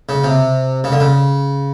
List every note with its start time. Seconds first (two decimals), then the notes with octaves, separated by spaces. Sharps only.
0.09 C#3
0.24 C3
0.84 C#3
0.92 D3
1.00 C#3